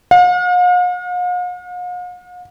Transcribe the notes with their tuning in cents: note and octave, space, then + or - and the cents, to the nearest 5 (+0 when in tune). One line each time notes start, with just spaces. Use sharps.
F5 +45